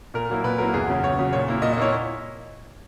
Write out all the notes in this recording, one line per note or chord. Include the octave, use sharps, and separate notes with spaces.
A#2 A#4
F#3 A#3 E4
A#2 B4
F#3 A#3 E4 A#4
E2 G#4
C#3 F#3
E2 C#5
C#3 F#3
A#2 C#5
A#3 E4
A#2 D#5
D#5
A#3 E4 C#5